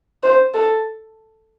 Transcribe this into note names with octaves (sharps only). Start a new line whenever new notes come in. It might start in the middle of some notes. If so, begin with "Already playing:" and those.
C5
A4